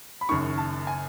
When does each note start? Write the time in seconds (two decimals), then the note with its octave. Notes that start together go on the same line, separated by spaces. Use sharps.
0.21 B5
0.29 F#1 F#2 D#3 C#6
0.58 A5
0.87 G#5